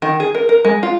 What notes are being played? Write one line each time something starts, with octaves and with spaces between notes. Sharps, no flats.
D#3
G#4
A#4
A#4
G#3
F4